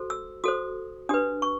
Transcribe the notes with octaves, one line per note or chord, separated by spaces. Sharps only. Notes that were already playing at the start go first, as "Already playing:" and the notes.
Already playing: F#4 A4 C5
E6
F#4 A4 C5 D#6
D4 G4 B4 D#6
C#6